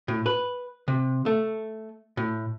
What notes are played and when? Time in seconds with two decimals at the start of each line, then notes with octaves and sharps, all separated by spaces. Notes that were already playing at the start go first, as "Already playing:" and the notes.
0.08 A2
0.26 B4
0.88 C3
1.26 A3
2.17 A2